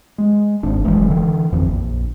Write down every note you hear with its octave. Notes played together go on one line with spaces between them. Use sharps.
G#3
G#1 D4
F1 E3 F#3 G#3
D3 E3
G#1 F2 E3
A#1